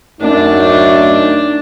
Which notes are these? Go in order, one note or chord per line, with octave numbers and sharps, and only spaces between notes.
F#2 A3 D4 D#4